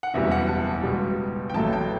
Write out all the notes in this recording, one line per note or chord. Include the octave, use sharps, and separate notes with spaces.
F#5
F#1 E2 B2 G3 E5
F#5
A5
C#2 B2 G3
G5
A1 A2 F#3 A3 A5
G5